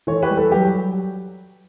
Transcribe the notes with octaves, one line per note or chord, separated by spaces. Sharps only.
E3 A4 C#5
G4 B4
G3
A4
F#3 G4